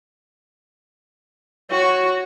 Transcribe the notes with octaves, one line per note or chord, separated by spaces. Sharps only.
F#4 C#5